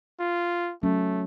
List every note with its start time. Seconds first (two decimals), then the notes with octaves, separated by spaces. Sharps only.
0.19 F4
0.83 F#3 A3 C#4